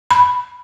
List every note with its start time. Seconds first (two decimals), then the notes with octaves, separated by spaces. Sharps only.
0.11 B5